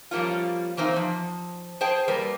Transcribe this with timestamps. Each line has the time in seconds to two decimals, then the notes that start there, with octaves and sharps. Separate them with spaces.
0.11 F3 G3 A#3 C#4 F4
0.77 E3 A#3 C4 D#4
0.96 F3
1.81 G#4 C5 G5 A5
2.08 G3 A#3 B4